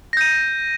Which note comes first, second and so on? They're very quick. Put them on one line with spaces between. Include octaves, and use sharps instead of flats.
A#6 G6 D#7